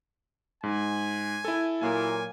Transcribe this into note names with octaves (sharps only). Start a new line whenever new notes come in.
G#2 G#5
E4 A4
A#2 F#3 A#3 G#5